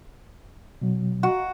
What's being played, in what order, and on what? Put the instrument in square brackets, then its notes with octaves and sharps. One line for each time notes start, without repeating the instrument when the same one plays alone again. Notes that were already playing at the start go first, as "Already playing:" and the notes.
[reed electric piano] B2 F#3
[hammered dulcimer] F#4